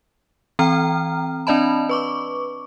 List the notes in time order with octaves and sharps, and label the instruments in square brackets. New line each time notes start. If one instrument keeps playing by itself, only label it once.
[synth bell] E3 C4 G5 A#5 F6
C4 D4 D5 D#5 A5 B5
B4 C#6 D6